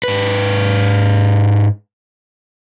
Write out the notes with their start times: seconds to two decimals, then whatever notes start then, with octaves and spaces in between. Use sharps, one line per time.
0.03 G#2 B4